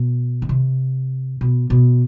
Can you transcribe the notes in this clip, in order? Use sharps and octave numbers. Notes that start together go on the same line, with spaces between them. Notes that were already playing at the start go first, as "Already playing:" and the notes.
Already playing: B2
D#3
C3
B2
B2